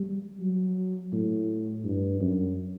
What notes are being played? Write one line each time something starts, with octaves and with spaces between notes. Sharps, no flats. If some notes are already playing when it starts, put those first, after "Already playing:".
Already playing: G3
F#3
A2
G2
F#2